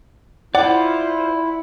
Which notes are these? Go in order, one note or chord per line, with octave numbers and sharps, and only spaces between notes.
E4 F4 C5 D5 F#5